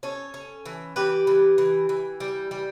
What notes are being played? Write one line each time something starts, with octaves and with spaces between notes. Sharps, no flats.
C#4 A4 C#5
C#4
E3
E3 G4 B4
E3
E3
E3
G3
G3